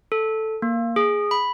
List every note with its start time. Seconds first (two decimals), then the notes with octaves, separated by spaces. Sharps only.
0.12 A4
0.62 A#3
0.96 G#4
1.31 B5